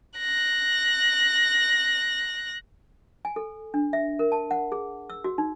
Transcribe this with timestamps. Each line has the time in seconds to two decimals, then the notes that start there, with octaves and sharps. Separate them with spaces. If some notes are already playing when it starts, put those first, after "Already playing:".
0.19 F#6 A#6
3.25 G#5
3.36 A4
3.74 D4
3.93 E5
4.19 A#4
4.32 A5
4.51 F#5
4.72 G#4
5.10 E6
5.24 F#4
5.38 D#4